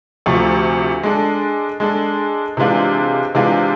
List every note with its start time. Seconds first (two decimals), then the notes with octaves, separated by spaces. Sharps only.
0.26 D2 C3 F3 A3
1.03 G#3 D4 A4
1.80 G#3 D4 A4
2.57 C3 E3 G#3 D4 F4
3.35 C3 E3 G#3 D4 F4